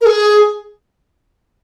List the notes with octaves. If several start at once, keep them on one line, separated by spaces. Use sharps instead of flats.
A#4
G#4